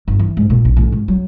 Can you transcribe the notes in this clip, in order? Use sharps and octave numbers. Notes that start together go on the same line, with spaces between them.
G1
E3
G#2
A#2
A#1
A1
G#2
F#3